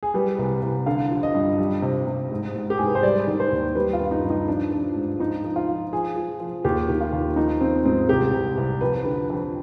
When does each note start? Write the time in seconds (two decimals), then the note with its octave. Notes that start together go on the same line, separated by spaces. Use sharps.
0.03 G#4
0.14 G3 B4
0.39 C2
0.63 C2
0.86 D3 F5
1.11 F3
1.23 D#5
1.34 G2
1.58 G3
1.82 C3
2.07 C3
2.32 G#2
2.55 G#2
2.70 G4
2.78 G#2 G#4
2.86 B4
2.95 C5
3.03 G3 D5
3.27 D#3
3.40 C5
3.52 D#2
3.75 G3 B4
3.93 F4
4.00 G2
4.11 D#4
4.24 G2
4.30 D#4
4.48 F3 D4
4.71 F3
4.95 G#2
5.19 F3 D#4
5.44 F3
5.56 F4
5.68 F3
5.93 F3 G#4
6.16 F3
6.40 F3
6.64 D#2 G4
6.89 D#3
7.01 F4
7.12 D#2
7.36 F3 D#4
7.61 F3 C4
7.85 G#2 C4
8.09 C2 G4
8.34 C2
8.57 C2
8.81 F2 B4
9.05 D3
9.30 F2